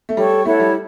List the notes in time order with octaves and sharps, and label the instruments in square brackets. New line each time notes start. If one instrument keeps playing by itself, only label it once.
[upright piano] A3
[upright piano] G3 [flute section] A4 C#5 G5 C#6
[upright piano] A3 [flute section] E4 A4 C#5 F#5
[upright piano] G3